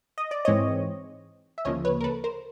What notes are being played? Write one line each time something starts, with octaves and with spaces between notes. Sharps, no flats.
D#5
D5
G#2 E3 G#3 C4 C#5 D#5
E5
D2 C#3 F3 A#3 C#5 D#5
B4 C#5
A#4
A4 B4
A#4 C5